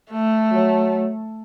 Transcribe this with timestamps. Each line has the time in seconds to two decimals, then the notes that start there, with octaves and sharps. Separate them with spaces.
0.11 A3
0.51 F#3